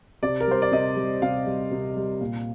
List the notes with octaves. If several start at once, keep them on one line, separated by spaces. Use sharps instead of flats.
C3 D5
A#4
G3 C5
D5
C3 D#5
G3
C3 F5
G3
C3
G3
A#2